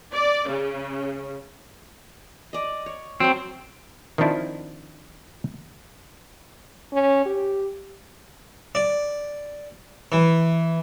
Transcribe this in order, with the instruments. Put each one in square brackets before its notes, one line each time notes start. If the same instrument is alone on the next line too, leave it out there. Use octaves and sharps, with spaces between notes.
[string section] D5
C#3
[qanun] D5 D#5
C#5
[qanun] F#3 C#5 A5 [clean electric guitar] C4
[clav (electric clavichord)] D#3 F3 C4 D4 E4 F4
[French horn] C#4
G4
[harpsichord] D5
E3